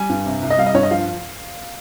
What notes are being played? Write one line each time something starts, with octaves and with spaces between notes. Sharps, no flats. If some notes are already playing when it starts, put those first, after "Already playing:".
Already playing: G3 G#5
G2
C3
C2
D#5
G3 F5
D#5
G2 C#5
D#5
F3 F5